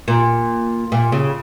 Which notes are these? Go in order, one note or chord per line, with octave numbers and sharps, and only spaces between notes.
A#2
A#2
C#3